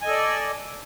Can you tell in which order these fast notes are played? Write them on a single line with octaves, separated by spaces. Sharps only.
G#5 D#5 A4 D5